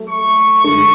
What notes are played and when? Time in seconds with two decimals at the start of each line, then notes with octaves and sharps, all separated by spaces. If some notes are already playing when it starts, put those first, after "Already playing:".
Already playing: F#3 A3
0.09 C#6
0.64 F#2 D3 G#3 D4 A4 C#6